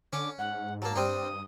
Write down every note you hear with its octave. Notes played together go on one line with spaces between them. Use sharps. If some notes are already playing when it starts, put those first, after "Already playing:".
D3 C#4 D6
G#2 F#5
F#3 A#3 A5
G2 G3 C4 D4 D#6